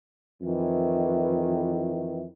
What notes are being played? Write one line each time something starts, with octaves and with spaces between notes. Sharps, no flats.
F2 D#3 E3